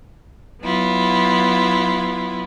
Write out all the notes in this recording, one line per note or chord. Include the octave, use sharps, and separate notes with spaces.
F#3 B3 E4 F4